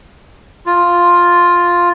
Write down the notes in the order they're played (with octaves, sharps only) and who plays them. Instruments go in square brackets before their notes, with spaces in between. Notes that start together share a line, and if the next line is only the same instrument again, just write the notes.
[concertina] F4